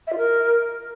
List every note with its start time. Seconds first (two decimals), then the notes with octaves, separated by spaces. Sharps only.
0.07 E5
0.12 F4
0.17 A#4